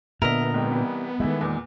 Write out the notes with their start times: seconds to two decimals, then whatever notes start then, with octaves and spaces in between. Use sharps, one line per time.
0.22 A#2 D3 B3 A#4 D#5 E5
0.54 G#2 G#3 C4
0.71 C3 E3 G3
1.20 D#3 E3 G#3 A3 E4
1.41 E2 A#2